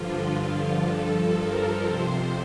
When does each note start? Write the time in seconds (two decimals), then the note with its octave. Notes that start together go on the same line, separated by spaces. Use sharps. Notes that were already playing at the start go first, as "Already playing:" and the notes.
Already playing: G2 D3 F3 F4
0.86 G2 F3 A4
1.36 A#4
1.85 F2 C3 F3 C5